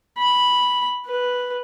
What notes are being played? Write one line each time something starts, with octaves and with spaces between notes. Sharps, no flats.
B5
B4